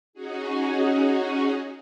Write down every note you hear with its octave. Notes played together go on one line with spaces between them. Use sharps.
C#4 D#4 F#4 G#4